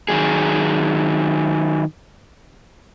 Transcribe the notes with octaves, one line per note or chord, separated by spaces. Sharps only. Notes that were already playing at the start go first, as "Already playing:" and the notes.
D#3 F#3 G#4